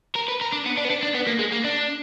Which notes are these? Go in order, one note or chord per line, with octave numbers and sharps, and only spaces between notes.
A#4
B4
A#4
D4
B3
D4
B3
D4
D4
B3
A#3
G#3
A#3
D4